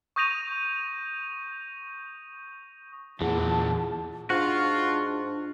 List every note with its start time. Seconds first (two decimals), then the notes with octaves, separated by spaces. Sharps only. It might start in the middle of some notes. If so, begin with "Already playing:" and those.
0.16 C#6 D#6 G6 A#6 D#7 F7
3.21 E2 A#2 E3 G#4 F#5 A5
4.30 G#2 D4 F4 F#4